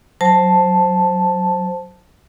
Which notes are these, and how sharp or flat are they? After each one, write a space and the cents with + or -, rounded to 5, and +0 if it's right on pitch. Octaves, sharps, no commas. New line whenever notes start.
F#3 +0 C5 +0 A5 +0